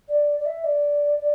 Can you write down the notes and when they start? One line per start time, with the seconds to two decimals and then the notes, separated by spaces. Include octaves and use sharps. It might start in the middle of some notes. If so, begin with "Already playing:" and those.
0.08 D5
0.39 D5
0.45 E5
0.64 D5
1.19 D5